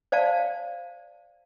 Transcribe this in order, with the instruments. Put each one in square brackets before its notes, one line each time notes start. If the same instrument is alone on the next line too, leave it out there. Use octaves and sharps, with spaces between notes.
[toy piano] C5 D5 F5 A5